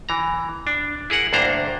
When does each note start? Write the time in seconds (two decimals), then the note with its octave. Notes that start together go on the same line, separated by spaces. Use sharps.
0.09 E3 A#5
0.67 D4
1.10 E4 G#4 A#4 F#5
1.33 D2 G2 A#3 D4 C5 A#5